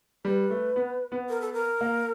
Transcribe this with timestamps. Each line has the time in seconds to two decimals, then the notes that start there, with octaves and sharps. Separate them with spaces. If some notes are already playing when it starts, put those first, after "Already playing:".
0.25 G3 B4
0.50 A3
0.76 B3
1.12 B3
1.29 A#4
1.41 A4
1.53 A#4
1.81 A#3